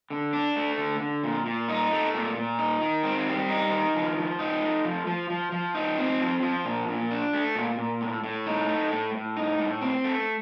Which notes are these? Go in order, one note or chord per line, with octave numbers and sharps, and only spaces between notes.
D3
D4
A3
D3
D3
A#2
A#2
D#4
A3
A#2
A#2
D#4
D#3
C4
G3
D#4
D#3
F3
F3
D#4
A3
F3
F3
F3
F3
D#4
C4
F3
F3
A#2
A#2
D4
A3
A#2
A#2
A2
A2
D#4
A3
A2
A2
D#4
A2
C4
A3